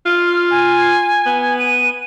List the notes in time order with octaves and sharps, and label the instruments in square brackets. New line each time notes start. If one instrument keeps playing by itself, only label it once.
[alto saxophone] F4
[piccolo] F6
G#5
[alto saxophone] B3
[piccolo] D#7